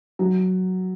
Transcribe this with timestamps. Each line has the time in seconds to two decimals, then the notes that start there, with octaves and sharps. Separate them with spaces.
0.19 F#3